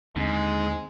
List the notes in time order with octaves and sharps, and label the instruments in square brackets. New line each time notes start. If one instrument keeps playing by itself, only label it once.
[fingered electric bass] D#2 D3 C4 [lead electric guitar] G#2 [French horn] G#3